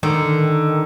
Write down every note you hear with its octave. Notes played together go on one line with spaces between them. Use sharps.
D3 D#3